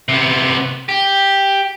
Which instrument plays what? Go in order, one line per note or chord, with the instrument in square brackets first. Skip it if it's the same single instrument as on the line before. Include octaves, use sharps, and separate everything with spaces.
[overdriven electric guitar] C3 B3
G4